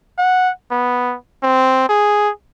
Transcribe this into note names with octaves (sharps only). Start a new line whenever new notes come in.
F#5
B3
C4
G#4